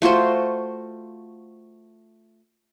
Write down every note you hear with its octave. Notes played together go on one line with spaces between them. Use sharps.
A3 F4 F#4 C5